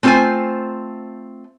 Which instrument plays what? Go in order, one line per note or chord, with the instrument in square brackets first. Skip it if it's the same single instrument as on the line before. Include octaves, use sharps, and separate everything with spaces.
[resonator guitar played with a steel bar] A3 C4 F4 A4 C5 G#5